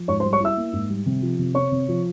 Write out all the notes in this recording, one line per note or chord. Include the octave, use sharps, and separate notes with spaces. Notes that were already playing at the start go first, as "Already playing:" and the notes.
Already playing: F3
G#2 C#5 C#6
C5 C6
G3
C#5 C#6
E4 E5 E6
A#3
G#2
G3
C3
F3
C3
C4 C#5 C#6
C3
F3